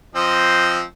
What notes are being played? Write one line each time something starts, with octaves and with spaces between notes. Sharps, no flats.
F3 C4 D#5